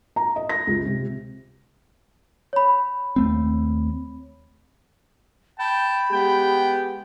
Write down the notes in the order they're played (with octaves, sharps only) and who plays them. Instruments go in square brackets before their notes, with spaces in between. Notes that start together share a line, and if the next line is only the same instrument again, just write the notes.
[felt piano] A#5
D#5
A#6
C#2
C3
[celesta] C#5 B5
[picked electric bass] D#2 A3 C4
[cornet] G5 [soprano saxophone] A5 [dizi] B5
[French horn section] G#3 G4 [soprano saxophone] B3 [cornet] G5